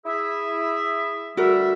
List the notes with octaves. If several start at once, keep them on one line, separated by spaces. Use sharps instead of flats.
E4 G#4 E5
D2 G3 F#4 A#4 E5